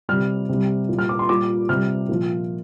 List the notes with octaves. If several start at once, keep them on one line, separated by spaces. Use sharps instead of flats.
C3 G3 F6
C3 G3
A#2 G3
F6
D6
C6
A#2 G3 D6
C3 G3 F6
A#2 F3